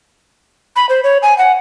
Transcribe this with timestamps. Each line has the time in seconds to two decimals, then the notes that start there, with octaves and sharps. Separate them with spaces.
0.76 B5
0.89 C5
1.04 C#5
1.22 G#5
1.38 F#5